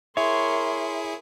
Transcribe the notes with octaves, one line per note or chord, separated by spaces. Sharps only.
E4 G#4 A#4 C#5 E5 C6